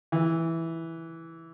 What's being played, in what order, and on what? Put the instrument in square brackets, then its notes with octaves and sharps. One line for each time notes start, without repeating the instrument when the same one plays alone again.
[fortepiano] E3